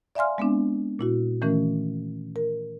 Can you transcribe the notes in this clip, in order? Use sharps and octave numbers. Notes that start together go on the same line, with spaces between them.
D5 E5 F5 G#5 C6 F6
G#3 B3 C4 D4
A#2 E4 F#4
D#3 E3 A3 C#4 A#4
A#4